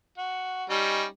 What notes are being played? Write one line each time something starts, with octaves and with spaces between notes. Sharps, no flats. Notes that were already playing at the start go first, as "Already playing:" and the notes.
F#4
G3 C#4 D#4